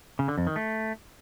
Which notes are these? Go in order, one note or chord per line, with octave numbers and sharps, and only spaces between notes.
C#3
D3
F2
D#3
A3